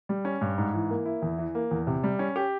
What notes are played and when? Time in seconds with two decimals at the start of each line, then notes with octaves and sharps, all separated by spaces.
0.09 G3
0.25 C#4
0.41 G2
0.58 G#2
0.74 E3
0.90 A#3
1.06 E4
1.22 E2
1.38 E3
1.55 A#3
1.71 E2
1.87 C3
2.04 G3
2.19 C#4
2.36 G4